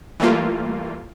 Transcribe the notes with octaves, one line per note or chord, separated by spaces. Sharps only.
E3 G3 A3 A#3 F4